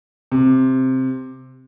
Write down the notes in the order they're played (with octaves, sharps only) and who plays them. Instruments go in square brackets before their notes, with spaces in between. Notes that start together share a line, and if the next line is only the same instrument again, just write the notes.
[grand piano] C3